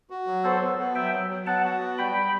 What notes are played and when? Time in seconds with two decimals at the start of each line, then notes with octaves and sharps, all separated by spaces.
0.10 F#4
0.27 F#3
0.44 B3 A4 C5
0.62 B3
0.78 B3
0.95 F#3 E5 G5
1.13 F#3
1.30 F#3
1.46 B3 F#5 A5
1.64 F#4
1.81 B3
1.98 G3 G5 B5
2.15 G3